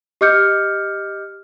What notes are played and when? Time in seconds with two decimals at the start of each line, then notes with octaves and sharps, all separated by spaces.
0.21 G4 D#5 D6 F6 G6 C#7